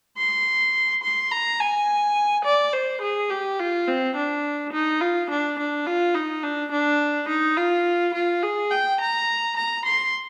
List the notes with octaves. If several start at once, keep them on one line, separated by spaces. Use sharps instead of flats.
C6
C6
A#5
G#5
D5
C5
G#4
G4
F4
C4
D4
D#4
F4
D4
D4
F4
D#4
D4
D4
D#4
F4
F4
G#4
G5
A#5
A#5
C6